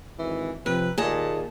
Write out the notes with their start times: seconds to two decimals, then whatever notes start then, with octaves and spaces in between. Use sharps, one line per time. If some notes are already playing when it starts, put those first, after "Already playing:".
0.19 G#1 E3
0.66 C3 F3 B4
0.98 D#2 A#2 G#4 D#5 A5